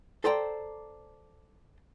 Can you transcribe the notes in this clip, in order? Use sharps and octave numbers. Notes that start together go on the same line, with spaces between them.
A4 C5 D5 G5 A#5